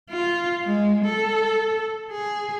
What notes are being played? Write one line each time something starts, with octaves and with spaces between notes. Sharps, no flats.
F4
G#3
A4
G#4